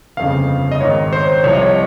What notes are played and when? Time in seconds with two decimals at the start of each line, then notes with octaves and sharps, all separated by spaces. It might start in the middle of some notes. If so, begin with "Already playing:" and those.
0.17 G1 F2 C#3 F5
0.72 D#5
0.80 G#1 G#2 D#3 C#5
1.13 C5
1.44 C2 C3 F3 C#5
1.53 D#5
1.62 C#5